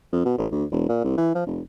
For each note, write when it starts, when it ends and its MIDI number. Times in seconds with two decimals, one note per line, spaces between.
0.13 0.25 41
0.25 0.34 47
0.38 0.46 33
0.52 0.65 38
0.72 0.85 28
0.89 0.99 46
1.04 1.16 36
1.18 1.34 52
1.35 1.46 53
1.46 1.61 29